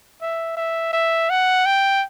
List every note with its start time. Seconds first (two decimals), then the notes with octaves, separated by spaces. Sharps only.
0.22 E5
0.57 E5
0.93 E5
1.30 F#5
1.66 G5